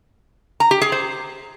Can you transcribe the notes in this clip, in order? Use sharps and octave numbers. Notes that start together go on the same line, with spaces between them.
A#5
G4
G#4
C5